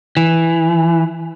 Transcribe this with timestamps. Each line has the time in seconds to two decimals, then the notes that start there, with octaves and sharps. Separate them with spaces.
0.17 E3